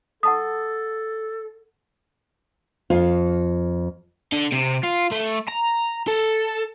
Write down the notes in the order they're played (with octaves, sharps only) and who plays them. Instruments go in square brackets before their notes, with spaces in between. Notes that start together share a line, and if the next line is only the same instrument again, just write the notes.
[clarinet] A4 [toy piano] F#5 A5 D#6
[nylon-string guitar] F2 F4 F5
[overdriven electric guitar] D3
C3
F4
A3
A#5
A4